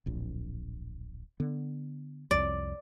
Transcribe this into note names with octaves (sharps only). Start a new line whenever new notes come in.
D1 A#1
D3 B3
C2 F2 D5